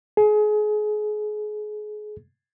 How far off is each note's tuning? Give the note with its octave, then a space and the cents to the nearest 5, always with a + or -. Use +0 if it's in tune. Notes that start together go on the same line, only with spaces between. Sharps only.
G#4 +30